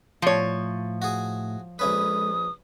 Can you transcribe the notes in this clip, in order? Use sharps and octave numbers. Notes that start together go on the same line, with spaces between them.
A2 F3 A3 C#5
F#4 G#4
A#1 G#3 C#4 A4 B4 D#6